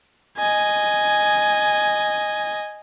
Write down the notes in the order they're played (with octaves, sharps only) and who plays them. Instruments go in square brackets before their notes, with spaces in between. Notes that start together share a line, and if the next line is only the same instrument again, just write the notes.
[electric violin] D#5 G#5